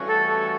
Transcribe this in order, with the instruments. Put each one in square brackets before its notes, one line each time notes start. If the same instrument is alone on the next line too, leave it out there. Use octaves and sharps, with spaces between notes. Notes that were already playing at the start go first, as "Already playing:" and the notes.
Already playing: [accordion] G2 E3 A3 C#4 F#4
[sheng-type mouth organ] A4
A4